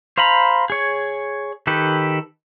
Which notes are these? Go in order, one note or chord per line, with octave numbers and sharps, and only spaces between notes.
C5 F5 A#5 B5
G#4 C#5
D#3 G4 A4 B4